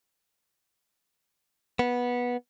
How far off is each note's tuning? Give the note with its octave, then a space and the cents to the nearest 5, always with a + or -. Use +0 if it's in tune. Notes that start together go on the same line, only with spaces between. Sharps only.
B3 -15